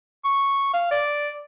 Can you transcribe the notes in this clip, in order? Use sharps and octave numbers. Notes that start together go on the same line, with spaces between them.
C#6
F5
D5